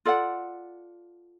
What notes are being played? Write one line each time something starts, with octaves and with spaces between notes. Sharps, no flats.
F4 A4 D5 F#5